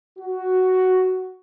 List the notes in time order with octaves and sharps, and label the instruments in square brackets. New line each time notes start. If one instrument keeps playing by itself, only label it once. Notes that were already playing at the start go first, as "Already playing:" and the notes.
[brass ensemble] F#4